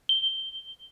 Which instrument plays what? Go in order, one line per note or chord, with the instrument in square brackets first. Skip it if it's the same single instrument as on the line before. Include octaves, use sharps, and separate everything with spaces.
[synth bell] G7